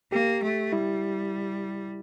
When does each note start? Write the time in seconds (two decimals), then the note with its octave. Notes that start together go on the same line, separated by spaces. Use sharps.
0.12 A#3 G4
0.43 A3
0.72 G3 E4